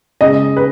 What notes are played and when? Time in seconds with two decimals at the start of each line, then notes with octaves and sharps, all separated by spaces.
0.21 C#3 G#3 D#5
0.57 B4